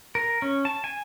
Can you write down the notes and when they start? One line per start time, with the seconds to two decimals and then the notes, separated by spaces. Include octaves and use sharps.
0.15 A#4
0.42 C#4
0.65 A5
0.84 G#5